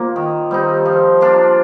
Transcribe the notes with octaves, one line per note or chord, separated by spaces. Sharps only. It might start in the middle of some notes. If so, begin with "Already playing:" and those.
Already playing: A#2 A#3 C4
D#3
G3 C4 D#4
F3
A#3 D4 F4